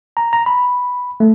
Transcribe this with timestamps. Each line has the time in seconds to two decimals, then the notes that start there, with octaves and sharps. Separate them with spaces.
0.17 A#5
0.33 A#5
0.46 B5
1.20 A3